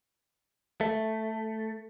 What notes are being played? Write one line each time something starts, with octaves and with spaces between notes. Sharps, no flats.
A3